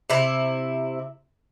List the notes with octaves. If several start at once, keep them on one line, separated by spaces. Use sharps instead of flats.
C3 E4